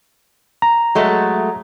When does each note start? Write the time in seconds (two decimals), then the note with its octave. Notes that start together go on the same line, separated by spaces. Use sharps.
0.62 A#5
0.95 F#3 G#3 A3